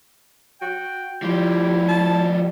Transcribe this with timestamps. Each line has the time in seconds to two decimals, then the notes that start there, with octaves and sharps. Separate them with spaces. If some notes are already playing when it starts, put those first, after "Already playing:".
0.62 F#4 G5
1.22 F3 G3 E4 G4
1.89 A5